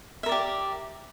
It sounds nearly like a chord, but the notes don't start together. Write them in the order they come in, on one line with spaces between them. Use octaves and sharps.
E5 A#4 D5 G4